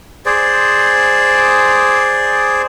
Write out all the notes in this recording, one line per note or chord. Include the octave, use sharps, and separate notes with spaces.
G#4 C5 D5